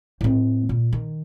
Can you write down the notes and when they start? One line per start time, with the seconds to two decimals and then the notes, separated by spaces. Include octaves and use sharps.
0.21 A2 C4
0.69 A#2
0.93 D#3